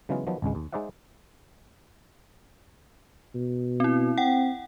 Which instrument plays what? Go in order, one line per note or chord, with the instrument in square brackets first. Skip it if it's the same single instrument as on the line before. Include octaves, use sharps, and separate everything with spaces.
[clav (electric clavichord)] C#3 E3 F#3 G#3 B3 F4
D#3 F3 F#3 B3
G#1 C#2 G#3
D#2
G#3 D#4 C5 D5 E5 F#5
[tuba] B2
[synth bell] C4 E4
[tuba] C4 [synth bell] F#5 G5